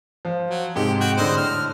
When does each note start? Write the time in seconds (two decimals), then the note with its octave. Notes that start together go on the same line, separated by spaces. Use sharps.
0.25 F3
0.50 F#3
0.75 G#2 C3 G4
1.01 F#4 G5
1.17 A2 D3 C5 D#5
1.37 F6